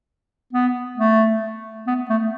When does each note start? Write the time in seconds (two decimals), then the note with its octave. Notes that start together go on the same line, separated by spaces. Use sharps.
0.53 B3
0.98 A3
1.87 B3
2.09 A3